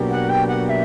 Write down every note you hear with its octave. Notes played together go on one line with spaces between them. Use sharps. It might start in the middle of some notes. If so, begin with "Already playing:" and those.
Already playing: B2 F#3 A#3 D4 G4
F#5
G5
F#5
F#5
E5